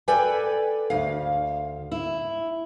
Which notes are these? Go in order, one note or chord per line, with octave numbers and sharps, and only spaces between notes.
A4 B4 D5 G5 G#5
D2 F5
E4